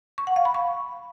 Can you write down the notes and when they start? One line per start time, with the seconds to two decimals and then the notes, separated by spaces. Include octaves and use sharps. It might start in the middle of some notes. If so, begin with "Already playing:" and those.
0.18 C#6
0.27 F#5
0.36 F5
0.45 B5
0.54 C#6